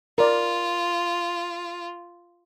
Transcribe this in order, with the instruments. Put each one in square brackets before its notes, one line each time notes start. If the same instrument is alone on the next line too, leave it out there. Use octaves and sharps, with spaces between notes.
[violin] F4 [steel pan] A#4 D5